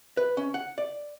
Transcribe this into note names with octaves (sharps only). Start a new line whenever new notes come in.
B4
C#4
F#5
D5